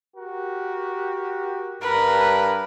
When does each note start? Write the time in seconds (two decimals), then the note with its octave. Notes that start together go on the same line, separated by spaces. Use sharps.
0.17 F#4 G4 A#4
1.82 G2 A#4 B4